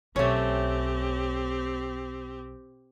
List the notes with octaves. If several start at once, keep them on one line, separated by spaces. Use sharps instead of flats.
B1 A3 C4 C#4 G4 C#5